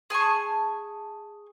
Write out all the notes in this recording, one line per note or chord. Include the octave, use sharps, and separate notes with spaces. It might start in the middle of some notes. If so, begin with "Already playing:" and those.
G#4 G#5 A5 C#6